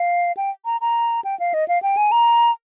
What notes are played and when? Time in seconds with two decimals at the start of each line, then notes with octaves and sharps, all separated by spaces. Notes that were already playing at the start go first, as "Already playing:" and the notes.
Already playing: F5
0.37 G5
0.65 A#5
0.81 A#5
1.24 G5
1.40 F5
1.54 D#5
1.68 F5
1.83 G5
1.97 G#5
2.12 A#5